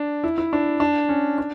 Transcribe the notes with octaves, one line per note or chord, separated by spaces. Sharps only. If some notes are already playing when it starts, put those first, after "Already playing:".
Already playing: D4
E4
E4
D4
D4
C#4
D4